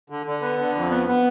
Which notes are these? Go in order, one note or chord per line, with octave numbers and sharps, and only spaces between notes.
D3
D3
B3
D3
F2
B3
B3